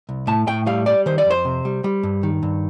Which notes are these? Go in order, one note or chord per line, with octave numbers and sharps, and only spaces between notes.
C2
A2 A5
A2 G5
G3 F5
G3 D5
D#3 C5
D5
F2
C5
C3
G3
G3
G2
D#3
G2